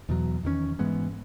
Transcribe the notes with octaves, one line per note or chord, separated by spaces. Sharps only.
E2 B2 F#3
E2 D#3 A3 C#4
G#2 E3 G#3 B3